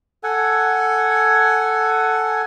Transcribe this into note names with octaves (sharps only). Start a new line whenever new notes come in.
A4 F#5 G#5